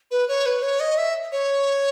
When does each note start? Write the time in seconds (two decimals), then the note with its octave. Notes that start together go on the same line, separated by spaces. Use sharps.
0.11 B4
0.28 C#5
0.46 B4
0.63 C#5
0.80 D#5
0.98 E5
1.32 C#5